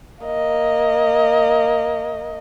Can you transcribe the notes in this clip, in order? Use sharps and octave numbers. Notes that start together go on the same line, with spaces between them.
A#3 D#5